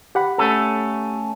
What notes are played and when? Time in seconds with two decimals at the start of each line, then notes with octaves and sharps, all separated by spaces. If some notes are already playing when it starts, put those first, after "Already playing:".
0.15 G4 F#5 B5
0.38 A3 C#4 A4